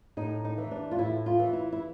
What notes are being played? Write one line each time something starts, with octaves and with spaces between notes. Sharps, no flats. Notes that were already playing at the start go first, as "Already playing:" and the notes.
A2 D#4
D#4
E3
D4
F4
A2 E4
F4
E3
E4
E4